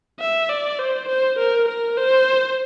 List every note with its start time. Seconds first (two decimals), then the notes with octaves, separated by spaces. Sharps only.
0.20 E5
0.49 D5
0.79 C5
1.09 C5
1.39 A#4
1.68 A#4
1.98 C5